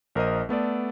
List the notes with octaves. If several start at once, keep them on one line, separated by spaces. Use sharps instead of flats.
A#1 A#4 C5 D#5 D#6
A3 B3 A4 D5